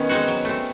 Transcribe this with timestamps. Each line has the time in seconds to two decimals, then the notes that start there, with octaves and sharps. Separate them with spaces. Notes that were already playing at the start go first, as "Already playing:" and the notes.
Already playing: D#3 B3 C#4
0.09 G#3 C4 D#4 F#4
0.28 F#3
0.45 A3 C4